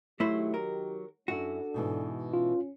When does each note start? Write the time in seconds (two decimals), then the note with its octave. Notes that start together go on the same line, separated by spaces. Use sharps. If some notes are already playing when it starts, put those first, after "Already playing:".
0.20 D#3 F#3 A3 D#4 E4 G4 C5
0.54 A#4
1.28 F#2 D4 E4 F#4 A4
1.74 G#2 B2 E3
2.33 C#4 F4